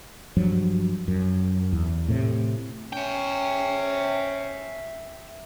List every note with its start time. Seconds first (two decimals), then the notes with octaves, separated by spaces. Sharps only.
0.37 G2 F3 F#3
1.08 F#2
1.73 E2
2.08 A2 C3
2.93 C#4 E5 G5